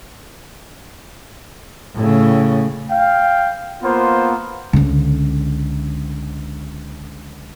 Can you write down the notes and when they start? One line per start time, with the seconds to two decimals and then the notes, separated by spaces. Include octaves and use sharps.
1.96 A2 C#3
2.91 F5 G5
3.83 A#3 B3 F4 C5
4.73 C#2 D3